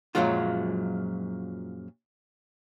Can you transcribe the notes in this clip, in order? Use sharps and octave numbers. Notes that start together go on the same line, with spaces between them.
F#2 A#2 F3 F#3 G#3 F4